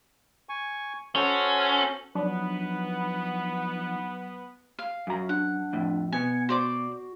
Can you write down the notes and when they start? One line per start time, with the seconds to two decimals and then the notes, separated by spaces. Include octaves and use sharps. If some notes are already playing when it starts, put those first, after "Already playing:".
0.49 G#5 C#6
1.16 C#4 F#4 A4 C5
2.15 F3 F#3 B3 D4 D#4 B4
4.79 F5
5.07 F#2 F#4 A#5
5.29 D4 F#5
5.73 F2 A2
6.12 B2 B3 G#5 C#7
6.49 F#4 C5 D5 D6